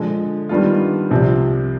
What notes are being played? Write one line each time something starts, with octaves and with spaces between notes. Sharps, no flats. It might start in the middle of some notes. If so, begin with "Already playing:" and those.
Already playing: D3 F3 G#3
D#3 G3 B3 D4 F4
C2 C3 F3 C4 G4